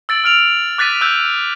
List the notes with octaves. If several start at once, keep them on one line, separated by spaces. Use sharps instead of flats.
E6 A6 D7 F#7
E6 F6 D7 F7
D6 F#6 A6 B6 D#7
E6 F#6 G6